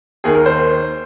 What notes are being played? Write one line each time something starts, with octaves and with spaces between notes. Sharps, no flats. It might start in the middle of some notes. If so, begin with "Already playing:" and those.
D#2 D#3 G#4
A#4
C5